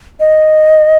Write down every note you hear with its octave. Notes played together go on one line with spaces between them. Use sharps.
D#5